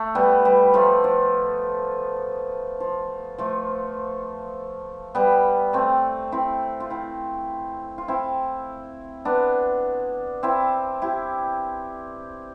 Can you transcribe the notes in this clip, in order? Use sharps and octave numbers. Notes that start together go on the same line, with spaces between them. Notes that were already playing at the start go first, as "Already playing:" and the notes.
Already playing: A3
G3 B3
G3 B3
F3 A3
F3
F3
F3 A3
G3 B3
A3 C4
C4 E4
F4
C4 E4
F4
C4 E4
B3 D4
C4 E4
E4 G4